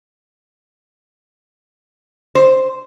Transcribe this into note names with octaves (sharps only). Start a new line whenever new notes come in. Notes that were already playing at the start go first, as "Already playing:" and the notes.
C5